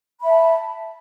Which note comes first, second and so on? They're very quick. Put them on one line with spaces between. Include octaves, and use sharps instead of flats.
B5 E5 A5